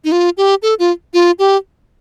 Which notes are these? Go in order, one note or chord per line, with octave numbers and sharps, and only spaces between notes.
D#4
F4
G4
A4
F4
F4
G4